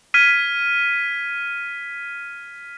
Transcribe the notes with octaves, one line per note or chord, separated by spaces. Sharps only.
F6 G#6 B6 D#7